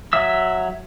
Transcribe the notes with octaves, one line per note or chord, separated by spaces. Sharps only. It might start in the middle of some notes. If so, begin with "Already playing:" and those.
F#3 E5 E6